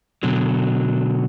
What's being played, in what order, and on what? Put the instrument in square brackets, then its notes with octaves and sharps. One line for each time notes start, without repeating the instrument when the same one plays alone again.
[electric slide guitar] B2 D3 F#3